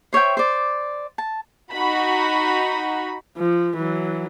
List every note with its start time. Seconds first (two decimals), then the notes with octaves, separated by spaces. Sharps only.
0.13 C5 C#5 E5 G5
0.37 C5 D5
1.18 A5
1.73 D#4 F#4 F#5 B5
3.37 F3
3.77 E3 F#3